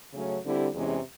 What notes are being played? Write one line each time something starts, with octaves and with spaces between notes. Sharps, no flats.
C#3 F#3 A3 C#4
D3 G3 C4 E4 G4
E2 C3 E3 G#3 C#4